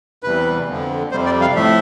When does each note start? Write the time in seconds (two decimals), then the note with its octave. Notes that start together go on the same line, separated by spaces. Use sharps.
0.23 E2 C3 E3 G3 B4
0.68 F2 D3 F3
1.11 F2 C3 G3 C5
1.26 D5
1.41 F5
1.55 A2 F3 A3 E5